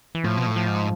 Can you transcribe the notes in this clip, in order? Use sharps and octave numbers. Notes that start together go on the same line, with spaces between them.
E3
A2 F3
B2
A2
F3
G#2